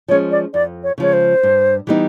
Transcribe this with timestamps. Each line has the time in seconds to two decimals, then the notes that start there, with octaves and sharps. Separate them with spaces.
0.08 F3 G#3 C#4 C#5
0.31 D5
0.54 F2 D5
0.84 C#5
0.98 C#3 F3 G#3 C#5
1.13 C5
1.43 G2
1.87 E3 G3 B3 D#4